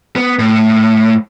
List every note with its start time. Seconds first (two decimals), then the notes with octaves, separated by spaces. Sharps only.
0.16 B3
0.39 A2